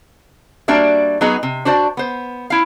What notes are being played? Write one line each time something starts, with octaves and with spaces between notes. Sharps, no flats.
G3 A#3 D4 F#4 D5 E5
F#3 B3 D#4 F#4 G#4
C3
D4 F#4 C5 D5 A5
B3 C5
E4 F5